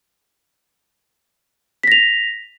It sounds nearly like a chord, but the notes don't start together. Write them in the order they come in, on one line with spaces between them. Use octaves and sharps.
B6 A#6 F7